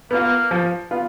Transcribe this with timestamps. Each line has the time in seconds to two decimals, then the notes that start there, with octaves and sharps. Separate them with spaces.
0.11 A#3 B3 F4
0.51 F3
0.91 B3 F4